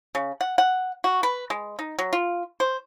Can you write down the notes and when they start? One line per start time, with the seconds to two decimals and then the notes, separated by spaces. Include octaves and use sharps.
0.15 C#3
0.41 F#5
0.58 F#5
1.04 F#4
1.23 B4
1.50 G#3
1.79 D#4
1.99 F#3
2.13 F4
2.60 C5